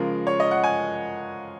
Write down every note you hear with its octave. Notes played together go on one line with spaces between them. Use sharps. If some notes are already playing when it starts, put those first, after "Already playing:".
Already playing: C#3 F3 G#3 A#4
C#5
D#5
F#5
G#5